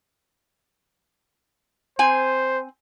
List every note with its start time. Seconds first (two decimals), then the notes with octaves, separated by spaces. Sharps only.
1.99 C4 C5 G#5